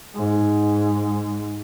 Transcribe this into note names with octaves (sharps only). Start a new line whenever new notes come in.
G#2